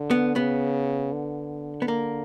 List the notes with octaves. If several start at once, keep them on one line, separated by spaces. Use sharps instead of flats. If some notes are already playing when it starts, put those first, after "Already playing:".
Already playing: D3
B3
C#3 B3
D3
B3
A#3